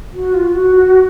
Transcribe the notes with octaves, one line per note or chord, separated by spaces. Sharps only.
F#4
F4
F#4